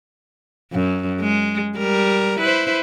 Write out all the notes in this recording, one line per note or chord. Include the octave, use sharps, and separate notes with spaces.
F#2
G#3
G3 A#4
E4 B4 C5